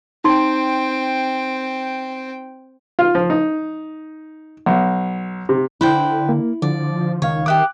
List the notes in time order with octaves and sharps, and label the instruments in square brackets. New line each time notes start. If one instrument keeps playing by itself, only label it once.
[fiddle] C4 G5 [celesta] D#4 C6
[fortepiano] F4
F3
D#4
B1
C3
[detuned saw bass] D3 [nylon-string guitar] E4 [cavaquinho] B4 C5 G5
[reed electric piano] A#3
[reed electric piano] D3 [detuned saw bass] F3 [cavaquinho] D5
[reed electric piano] C#2 F5 [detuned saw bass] D#3 [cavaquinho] C#5
[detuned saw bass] D#3 [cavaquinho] G4 E5 D#6 [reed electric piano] D6 F#6